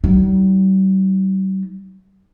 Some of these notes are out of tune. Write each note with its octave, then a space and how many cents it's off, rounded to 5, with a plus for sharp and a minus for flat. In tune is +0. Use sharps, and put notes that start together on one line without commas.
G3 -45 D#4 +25